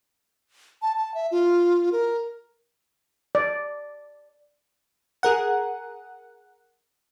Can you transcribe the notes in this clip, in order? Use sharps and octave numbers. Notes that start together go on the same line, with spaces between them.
A5
A5
E5
F4
A#4
D5
G#4 A#4 F#5